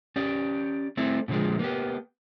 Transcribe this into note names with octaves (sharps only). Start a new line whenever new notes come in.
C#4 G4 D5
A3 C4 E4 A4
A#2 D3 D#3 F3 G#3
A#3 B3 G4